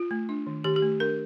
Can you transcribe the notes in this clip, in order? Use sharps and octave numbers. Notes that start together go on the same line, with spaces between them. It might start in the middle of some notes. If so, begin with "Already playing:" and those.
Already playing: F4
A3
D4
D#3
D#3 G4
G4
A3
D4 A#4